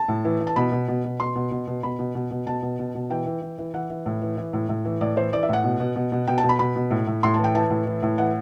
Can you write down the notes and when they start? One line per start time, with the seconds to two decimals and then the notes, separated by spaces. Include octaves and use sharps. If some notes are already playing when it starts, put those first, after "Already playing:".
Already playing: A5
0.08 A2
0.25 E3
0.40 E3
0.47 A5
0.56 B2 B5
0.72 B2
0.88 B2
1.04 B2
1.20 B2 C6
1.35 B2
1.51 B2
1.67 B2
1.83 B2 B5
1.99 B2
2.15 B2
2.31 B2
2.46 B2 A5
2.62 B2
2.79 B2
2.95 B2
3.10 E3 G5
3.26 E3
3.42 E3
3.58 E3
3.74 E3 F#5
3.90 E3
4.06 A2
4.22 E3
4.37 E3
4.53 A2
4.69 A2
4.85 E3
5.01 A2 D5
5.16 E3 C5
5.32 E3 D5
5.43 E5
5.49 A2 F#5
5.64 B2
5.80 B2
5.96 B2
6.12 B2
6.27 B2 G5
6.38 A5
6.44 B2
6.49 B5
6.59 B2 B5
6.76 B2
6.91 A2
7.07 A2
7.23 A2 C6
7.34 E3 A5
7.44 G5
7.55 E3 A5
7.70 A2
7.86 E3
8.03 A2
8.18 E3 F#5